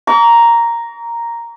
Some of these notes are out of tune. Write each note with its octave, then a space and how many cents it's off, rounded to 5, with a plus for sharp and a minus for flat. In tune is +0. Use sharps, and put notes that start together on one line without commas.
A#5 +0 C#6 +45